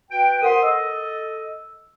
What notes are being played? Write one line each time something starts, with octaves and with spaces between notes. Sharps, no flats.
F#4 B4 G5
A#4 C5 F#5 C6 D#6
A4 D#5 E6